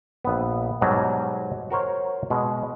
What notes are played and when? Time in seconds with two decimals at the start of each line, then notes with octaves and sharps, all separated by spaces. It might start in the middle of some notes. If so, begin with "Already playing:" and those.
0.25 A#1 B3
0.81 G#2 B2 F#3 G3
1.70 F#4 A#4 C5 C#5
2.30 B2 G#3